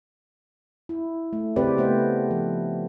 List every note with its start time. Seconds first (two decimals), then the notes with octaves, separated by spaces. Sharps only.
0.89 E4
1.33 A3
1.56 C#3 C4 G4 B4 D5
1.77 C#3 A3 B3 C5 D#5
2.31 F3